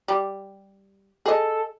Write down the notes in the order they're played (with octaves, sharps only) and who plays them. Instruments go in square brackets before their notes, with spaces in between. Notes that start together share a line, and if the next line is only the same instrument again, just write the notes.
[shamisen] G3
[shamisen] G#4 D#5 [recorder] A4